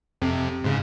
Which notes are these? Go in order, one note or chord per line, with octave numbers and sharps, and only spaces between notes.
F2 C3
G#2 C#3